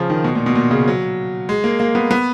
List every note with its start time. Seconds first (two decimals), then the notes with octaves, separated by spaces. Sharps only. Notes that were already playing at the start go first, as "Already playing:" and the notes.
Already playing: C#3 F3
0.10 D#3
0.24 B2
0.35 A#2
0.46 B2
0.55 A#2
0.71 C#3
0.88 F#3
1.49 G#3
1.64 A#3
1.80 A#3
1.95 B3
2.11 B3